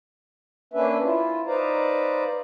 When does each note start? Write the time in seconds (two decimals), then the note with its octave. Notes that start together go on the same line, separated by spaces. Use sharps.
0.73 A#3 C#4 D4 B4 E5
1.03 E4 F4
1.47 D#4 B4 C5 D5 F5 A#5